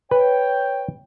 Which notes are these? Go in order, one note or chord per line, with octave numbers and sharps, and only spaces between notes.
B4 C#5 G5